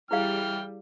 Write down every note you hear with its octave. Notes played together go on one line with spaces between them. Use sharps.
E3 G3 E4 G#4 F5 G5 F6